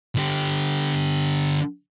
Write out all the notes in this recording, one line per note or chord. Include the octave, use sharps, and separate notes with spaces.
D3 G4